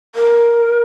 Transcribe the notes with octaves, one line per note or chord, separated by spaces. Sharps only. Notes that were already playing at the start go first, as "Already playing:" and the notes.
A#4